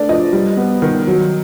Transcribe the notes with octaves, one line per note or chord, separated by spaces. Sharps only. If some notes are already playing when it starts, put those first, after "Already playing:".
Already playing: A3 D4 D5
F3 D#5
G3
B3
D#3
F#3